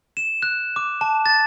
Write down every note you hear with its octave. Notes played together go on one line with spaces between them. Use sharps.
E7
F#6
D6
A5
A6